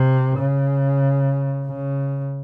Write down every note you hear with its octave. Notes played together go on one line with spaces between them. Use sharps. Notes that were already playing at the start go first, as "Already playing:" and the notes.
Already playing: C3
C#3
C#3